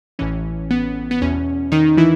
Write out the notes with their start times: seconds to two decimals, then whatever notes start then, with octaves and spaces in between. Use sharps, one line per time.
0.19 A1 A2 E3 C#4
0.71 B3
1.11 B3
1.22 E2 B2 C#4
1.72 D#3 D#4
1.97 E3 E4